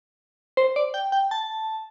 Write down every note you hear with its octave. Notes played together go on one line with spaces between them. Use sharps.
C5
D5
G5
G5
A5